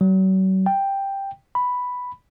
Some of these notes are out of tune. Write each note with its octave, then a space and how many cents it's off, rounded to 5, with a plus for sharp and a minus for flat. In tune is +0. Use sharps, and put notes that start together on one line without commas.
F#3 +40
G5 +5
B5 +0